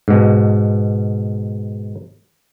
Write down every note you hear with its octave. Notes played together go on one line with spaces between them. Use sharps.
G#2 B2